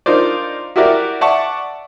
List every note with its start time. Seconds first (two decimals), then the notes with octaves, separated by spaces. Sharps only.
0.06 D4 D#4 F4 A#4 C5 D5
0.76 E4 F#4 G4 A#4 D5 E5
1.21 D5 E5 F#5 A5 C#6